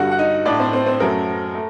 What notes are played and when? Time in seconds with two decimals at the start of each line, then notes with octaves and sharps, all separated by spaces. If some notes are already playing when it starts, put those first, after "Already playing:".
Already playing: G2 D3 G3 F#4 F#5
0.11 F#5
0.18 D#4 D#5
0.45 A2 A3 D4 D5
0.59 C4 C5
0.73 C4 C5
0.86 C4 C5
1.00 F#2 F#3 A3 A#4
1.54 A3